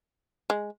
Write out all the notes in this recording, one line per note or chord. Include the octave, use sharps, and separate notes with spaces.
G#3